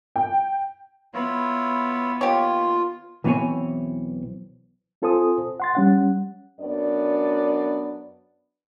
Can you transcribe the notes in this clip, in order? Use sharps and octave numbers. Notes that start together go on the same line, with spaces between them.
G5
B3 E4 F4 C#5
D#3 A#3 F4 G4 C#5
B1 E3 B3 C4 C#5 G#5
C4 F4 A4 C5 G#5 D#6
F#5 C6 A6
G3 C#4 F#5
F#2 B3 D4 D5